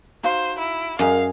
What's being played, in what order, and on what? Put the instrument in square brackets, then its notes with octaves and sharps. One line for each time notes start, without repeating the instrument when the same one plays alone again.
[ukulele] D#4 F#4 F5 [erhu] C5
[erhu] E4
[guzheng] F#2 [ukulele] C#4 G#4 D#5 [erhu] F5